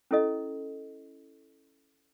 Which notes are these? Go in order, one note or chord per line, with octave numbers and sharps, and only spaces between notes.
C#4 E4 A4 D#5